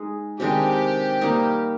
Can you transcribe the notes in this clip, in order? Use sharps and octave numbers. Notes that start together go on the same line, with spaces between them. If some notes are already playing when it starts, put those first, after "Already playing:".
Already playing: G#3 D#4 G#4
C3 D#3 G#3 D4 G4
G3 A#3 D#4